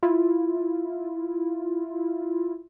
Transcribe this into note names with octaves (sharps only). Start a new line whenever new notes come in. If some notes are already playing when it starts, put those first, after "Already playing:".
E4 F4